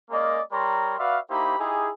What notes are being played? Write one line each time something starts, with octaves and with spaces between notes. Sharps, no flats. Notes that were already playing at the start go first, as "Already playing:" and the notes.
G#3 A#3 C#4 A#4 D5 D#5
G3 A#4 C#5 A#5 C6
F#4 B4 D5 E5 F5
A#3 D#4 E4 G4 C5 B5
D#4 E4 G4 G#4